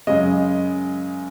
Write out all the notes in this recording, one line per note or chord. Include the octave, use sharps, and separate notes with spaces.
F#2 C#3 G#3 D#5